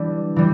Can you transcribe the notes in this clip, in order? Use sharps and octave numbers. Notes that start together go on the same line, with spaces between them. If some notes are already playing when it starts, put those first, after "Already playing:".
Already playing: E3 G3 D4
E3 G3